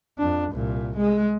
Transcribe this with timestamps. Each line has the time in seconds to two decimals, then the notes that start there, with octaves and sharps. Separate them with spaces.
0.19 F2 D4
0.52 C2 A#2
0.97 G#3